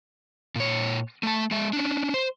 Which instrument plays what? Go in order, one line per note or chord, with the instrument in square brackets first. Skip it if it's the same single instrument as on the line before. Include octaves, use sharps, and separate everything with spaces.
[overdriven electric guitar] A#2 C#5
A3 A5
G#3 E5
C#4 D4
C5